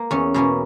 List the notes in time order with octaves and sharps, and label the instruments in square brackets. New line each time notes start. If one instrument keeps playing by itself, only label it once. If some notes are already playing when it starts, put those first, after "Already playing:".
Already playing: [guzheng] A#3
E2 C#4
B2 A#3 C#4